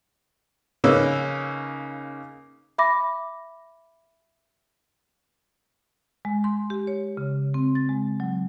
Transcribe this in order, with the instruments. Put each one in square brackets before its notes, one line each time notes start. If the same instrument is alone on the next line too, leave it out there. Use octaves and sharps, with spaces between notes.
[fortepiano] C#3 A#3 C#4 D#4 B4 E6
[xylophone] E5 B5 D6 A#6
[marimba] G#3
C6
G4
C#5
C#3
C4
A6
G#3
F#3